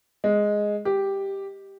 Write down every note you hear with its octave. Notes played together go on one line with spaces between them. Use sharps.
G#3
G4